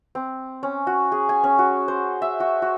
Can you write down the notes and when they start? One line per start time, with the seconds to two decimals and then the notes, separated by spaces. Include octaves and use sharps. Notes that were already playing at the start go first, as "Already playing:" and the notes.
0.15 C4
0.63 C#4
0.87 F#4
1.12 G#4
1.29 G#5
1.44 C#4
1.59 F#4
1.88 C5
2.22 E5
2.40 F#4
2.62 F#4